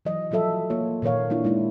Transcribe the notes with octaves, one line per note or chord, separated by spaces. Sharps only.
E3 F#3 D#5
F3 F#3 F4 A4 E5
A#3 F4 C#5
A#2 D#3 A#4 C#5 F5
A#3 D4 E4 F4
G#3 D#4 E4